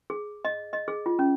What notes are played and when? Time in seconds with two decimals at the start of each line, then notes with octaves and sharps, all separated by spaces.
0.10 G#4
0.45 D#5
0.73 D#5
0.88 G#4
1.06 F4
1.19 C#4